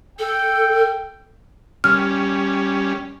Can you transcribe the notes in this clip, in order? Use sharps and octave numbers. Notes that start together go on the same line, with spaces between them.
A4 G5
G3 C#4 F6